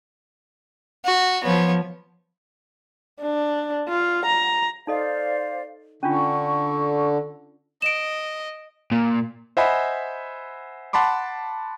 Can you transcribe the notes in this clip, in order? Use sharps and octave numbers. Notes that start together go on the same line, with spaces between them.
F#4
F3 B3 C#5
D4
F4
A#5
D#4 A4 C5 D5 D#5 F5
D3 C#4 D4 F4 C#6
D#5 D7 E7
A#2
C5 D#5 E5 F#5 G#5 B5
F#5 A5 B5 C6 D6